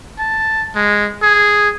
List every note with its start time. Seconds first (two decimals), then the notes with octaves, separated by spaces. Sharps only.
0.19 A5
0.75 G#3
1.22 G#4